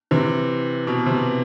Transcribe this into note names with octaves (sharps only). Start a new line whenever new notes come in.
C3 E3
B2
C3